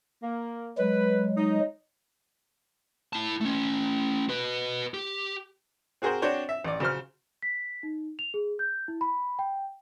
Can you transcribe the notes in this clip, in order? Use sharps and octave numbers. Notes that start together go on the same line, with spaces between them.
A#3
F#3 G#3 B4
D#4
E4 A5
A3 C#4
F#4 B4
G4
C4 F#4 G#4 A#4 C5
C4 D4 F#4 C5 C#5
E5
A1 D5
C#3 F#3 C5 F6
B6
D#4
F7
G#4
G6
E4
B5
G5